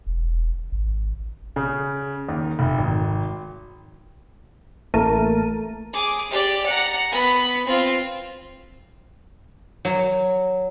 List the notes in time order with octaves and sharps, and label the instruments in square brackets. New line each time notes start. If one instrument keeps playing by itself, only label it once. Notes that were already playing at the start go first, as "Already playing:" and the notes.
[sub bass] E1
G#1
[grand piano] C#3
D#2
F1
G#1
[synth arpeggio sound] A1 A3 A#3 A#4 A5 D#7
[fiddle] G#4 D6
G4 D5
F#5 A#5
B3 B5
C4 F4
[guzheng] F#3